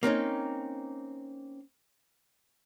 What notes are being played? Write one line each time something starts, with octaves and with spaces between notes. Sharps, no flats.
A#3 C4 C#4 D#4